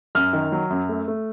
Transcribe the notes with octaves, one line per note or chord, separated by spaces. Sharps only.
F#2 F6
D#3
F#3
F#2
A3
A3